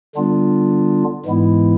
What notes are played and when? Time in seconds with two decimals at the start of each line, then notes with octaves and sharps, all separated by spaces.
0.15 D3 G3 B3 D4 F4
1.26 G#2 E3 G#3 B3 E4